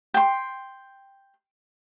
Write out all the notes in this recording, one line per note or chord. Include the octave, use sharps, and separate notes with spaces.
G5 C6